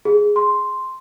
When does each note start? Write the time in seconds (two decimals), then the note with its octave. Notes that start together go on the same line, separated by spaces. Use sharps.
0.05 G#4
0.36 C6